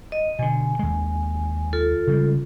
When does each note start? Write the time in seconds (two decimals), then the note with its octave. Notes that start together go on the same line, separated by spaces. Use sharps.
0.12 D#5
0.39 B2 D3 G#5
0.79 D#2 G#3
1.73 F4 A4
2.07 C#3 G3 G#3